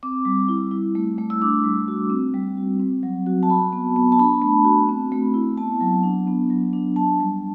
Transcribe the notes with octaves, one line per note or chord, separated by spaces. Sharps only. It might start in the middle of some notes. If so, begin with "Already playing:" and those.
C4 D6
G3
E4
E4
A3
A3
E6
D4 D6
G3
F#4
C4
G3
F#4
C4
F#3
F#4
A5
F#4 B5
B3
B3
A5
D4 B5
A3
F#4
C4
A3
E4
B3 A5
F#3
D4
B3
F#3
D4
D4 A5
G3